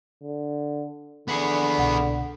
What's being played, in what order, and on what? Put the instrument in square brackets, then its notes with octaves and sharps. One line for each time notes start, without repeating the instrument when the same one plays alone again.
[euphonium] D3
[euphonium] D3 [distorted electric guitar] B3 G#4
[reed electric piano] C2 B2 F#5